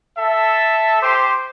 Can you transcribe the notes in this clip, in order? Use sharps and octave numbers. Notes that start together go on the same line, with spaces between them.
A4 E5 A5
G4 C5 C6 D6